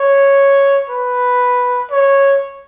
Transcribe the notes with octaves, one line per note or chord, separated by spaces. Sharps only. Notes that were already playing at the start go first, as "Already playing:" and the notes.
Already playing: C#5
B4
C#5